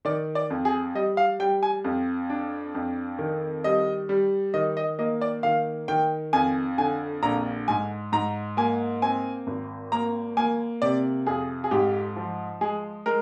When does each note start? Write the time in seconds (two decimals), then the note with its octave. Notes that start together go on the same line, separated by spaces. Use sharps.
0.05 D#3 D5
0.35 D5
0.50 F2
0.65 G#4
0.95 G3 D#5
1.17 F5
1.39 G3 G5
1.63 G#5
1.84 F2
2.30 D4
2.75 F2
3.19 D#3
3.64 G3 D#5
4.09 G3
4.54 D#3 D#5
4.77 D#5
4.99 A#3 D#5
5.21 D5
5.43 D#3 F5
5.88 D#3 G5
6.33 F2 G#5
6.78 D3 G#5
7.23 A#1 A#5
7.68 G#2 G#5
8.12 G#2 A#5
8.57 A#3 G#5
9.02 C4 G#5
9.47 G#1
9.92 A#3 A#5
10.37 A#3 G#5
10.82 C3 D5
11.27 F2 G#4
11.64 G#4
11.71 G#2 G4
12.16 F3
12.61 G#3 G#4
13.06 G#3 A#4